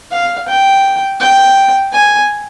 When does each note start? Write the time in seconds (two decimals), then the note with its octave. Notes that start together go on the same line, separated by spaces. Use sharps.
0.12 F5
0.49 G5
1.21 G5
1.93 G#5